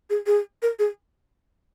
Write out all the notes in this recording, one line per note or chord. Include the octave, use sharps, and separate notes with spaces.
G#4
G#4
A#4
G#4